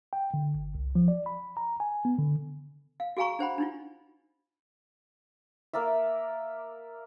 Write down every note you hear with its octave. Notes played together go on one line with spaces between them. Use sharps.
G5
D3
G1
C2
F3
D5
B5
A#5
G#5
B3
D3
F5
F#4 G#4 F5 G#5 A#5 C#6
D4 C5 F#5 B5
D4 D#4 F4
A#3 A#4 D5 E5